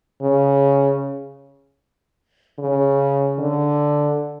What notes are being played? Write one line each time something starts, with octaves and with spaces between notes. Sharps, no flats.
C#3
C#3
D3